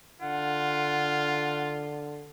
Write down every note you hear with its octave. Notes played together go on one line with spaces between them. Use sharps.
D3 F4 F#5